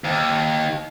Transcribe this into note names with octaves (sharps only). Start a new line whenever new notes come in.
D#2